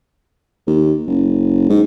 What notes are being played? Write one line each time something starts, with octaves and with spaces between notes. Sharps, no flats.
D#2
F#1
G#2